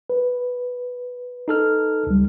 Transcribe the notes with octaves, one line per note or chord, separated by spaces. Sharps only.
B4
D#4 A4 F6
C#2 G3